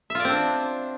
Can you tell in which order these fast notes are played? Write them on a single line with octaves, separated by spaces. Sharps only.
E5 F4 D5 C4 D4